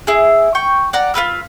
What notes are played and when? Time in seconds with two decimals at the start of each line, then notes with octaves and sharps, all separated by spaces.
0.07 E4 G#4
0.55 G5 C#6
0.93 D5 F#5 A#5
1.14 F4 A#4 B4 E6